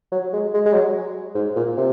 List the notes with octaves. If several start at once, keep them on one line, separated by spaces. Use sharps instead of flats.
F#3
G#3
G#3
G#3
F#3
G#2
A#2
C3